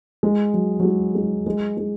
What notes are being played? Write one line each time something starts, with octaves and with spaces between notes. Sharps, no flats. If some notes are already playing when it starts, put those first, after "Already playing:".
G#3
F#3
F#3
G#3
G#3
G#3
G#3